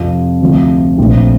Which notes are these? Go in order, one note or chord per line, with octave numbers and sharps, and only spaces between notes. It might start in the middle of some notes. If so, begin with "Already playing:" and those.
Already playing: F2 C3 F3
D2 C3 F3 A3
A#1 A#2 F3 A3 C4